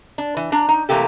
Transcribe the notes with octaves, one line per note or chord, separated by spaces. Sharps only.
D4
E3
D4 A#5
D#4
C3 E3 A3 A#3 G4 A4